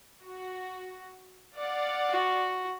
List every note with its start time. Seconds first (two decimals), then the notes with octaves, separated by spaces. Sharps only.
0.23 F#4
1.57 D5 F5 F#5
2.10 F#4